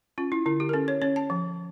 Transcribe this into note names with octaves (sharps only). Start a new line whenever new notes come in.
C#4 F4
E4
D3 E4
G4
A#4
C#4 A4
C#5
C#4 C#5
A5
F3